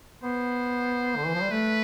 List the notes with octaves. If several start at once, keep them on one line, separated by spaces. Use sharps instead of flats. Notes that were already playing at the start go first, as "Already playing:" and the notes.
B3 C5
D3
E3
F3
G3
A3 B4